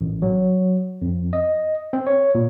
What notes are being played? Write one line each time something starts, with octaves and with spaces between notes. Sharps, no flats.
A1
F#3
F2
D#5
C4
C#5
A#2